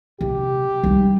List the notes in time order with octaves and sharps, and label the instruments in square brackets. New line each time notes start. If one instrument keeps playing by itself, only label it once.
[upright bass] C3 [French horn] G4
[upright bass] G3 D#4